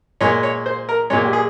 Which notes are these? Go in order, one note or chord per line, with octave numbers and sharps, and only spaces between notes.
A#2 G#3 C#5
C#5
C5
A#4
A#2 G#3 C#5
G4
G#4